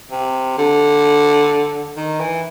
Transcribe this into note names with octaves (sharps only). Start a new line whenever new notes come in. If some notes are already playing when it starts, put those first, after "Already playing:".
C3
D3
D#3
E3